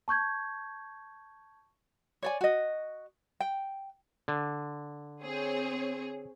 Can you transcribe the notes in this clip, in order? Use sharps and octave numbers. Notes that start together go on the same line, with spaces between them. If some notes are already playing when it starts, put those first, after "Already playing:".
A5 C#6 G6 G#6
C#5 D5 G#5
F#4 D#5
G5
D3
C4 G#4 C#5